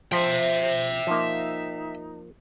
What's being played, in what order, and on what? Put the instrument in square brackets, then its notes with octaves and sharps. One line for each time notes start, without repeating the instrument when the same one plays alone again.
[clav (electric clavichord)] F3 [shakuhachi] C5 [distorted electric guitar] E5 G5
[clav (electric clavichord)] F3 A#3 [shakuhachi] D#4